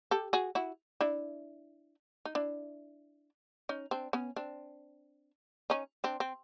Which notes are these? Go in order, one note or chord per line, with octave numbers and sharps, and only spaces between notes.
G4 A4
F#4 G#4
E4 F#4
D4 E4
D#4
D4 E4
C#4 D#4
C4 D4
B3 C#4
C4 D4
C#4 D#4
C4 D4
C4